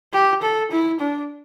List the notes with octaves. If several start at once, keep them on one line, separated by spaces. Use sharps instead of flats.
G4
A4
E4
D4